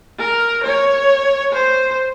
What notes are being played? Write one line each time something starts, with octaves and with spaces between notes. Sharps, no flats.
A#4
C#5
C5